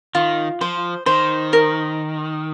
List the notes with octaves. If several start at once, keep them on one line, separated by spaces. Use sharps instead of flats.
D#3 F4
F3 C5
D#3 C5
A#4